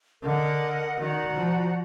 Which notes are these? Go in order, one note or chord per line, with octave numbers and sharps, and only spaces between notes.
D3 A#4 D#5 F#5
D#3 F#4 D5 F#5 A#5
F3